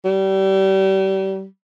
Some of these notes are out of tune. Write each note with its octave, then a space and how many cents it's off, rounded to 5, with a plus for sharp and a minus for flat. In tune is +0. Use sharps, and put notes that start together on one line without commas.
G3 -30